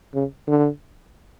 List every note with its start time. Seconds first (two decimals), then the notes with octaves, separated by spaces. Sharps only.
0.14 C#3
0.47 D3